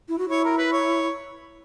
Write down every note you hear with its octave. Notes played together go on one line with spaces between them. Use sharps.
E4
F#4
E4 C#5
A#4
B4
C#5